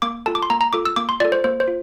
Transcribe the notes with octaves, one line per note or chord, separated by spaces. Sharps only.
A#3 D6
F4 A4 A5
D6
C6
A#3 A#5
A#5
F4 A4 D6
E6
A#3 D6
C6
F4 A4 D5
C5
A#3 C5
C5
F4